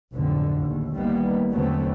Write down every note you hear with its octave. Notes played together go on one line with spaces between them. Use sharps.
B1 F2 A2 D3
A#1 D#2
A1 D#3 G3 A#3 B3
E2 D3 F#3 A3 B3 C4